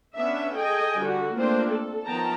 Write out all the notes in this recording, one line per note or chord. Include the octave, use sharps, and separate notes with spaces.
B3 C#4 D4 E5
G#4 A4 D#5 G5 G#5
D3 G3 F#4
A3 A#3 C4 D4 F4 C5
A4
D#3 F3 B3 G5 A5 A#5